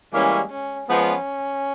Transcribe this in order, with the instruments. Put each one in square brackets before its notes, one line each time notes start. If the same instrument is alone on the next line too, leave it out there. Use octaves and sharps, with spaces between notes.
[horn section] E3 G3 A#3 C#4 [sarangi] G#3
[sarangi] C#4
[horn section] F3 G#3 B3 [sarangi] C#4